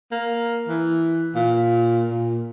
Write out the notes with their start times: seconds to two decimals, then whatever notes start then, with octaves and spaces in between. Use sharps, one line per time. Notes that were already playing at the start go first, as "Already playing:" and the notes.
0.12 A#3
0.68 E3
1.35 A#2
2.11 A#2